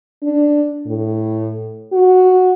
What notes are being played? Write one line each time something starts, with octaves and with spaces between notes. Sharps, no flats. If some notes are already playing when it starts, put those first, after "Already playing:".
D4
A2
F#4